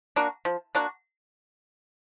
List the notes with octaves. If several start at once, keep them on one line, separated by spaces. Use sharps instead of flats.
A#3 D4 F#4
F3
A#3 D4 F#4